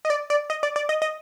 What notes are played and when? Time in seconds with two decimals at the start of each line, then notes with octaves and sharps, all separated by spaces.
0.05 D#5
0.10 D5
0.30 D5
0.50 D#5
0.63 D5
0.76 D5
0.89 D#5
1.02 D#5